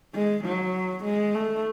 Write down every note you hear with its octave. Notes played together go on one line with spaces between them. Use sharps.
G#3
F#3
G#3
A3